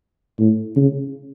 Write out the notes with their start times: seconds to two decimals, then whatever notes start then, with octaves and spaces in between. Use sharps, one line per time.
0.39 A2
0.76 C#3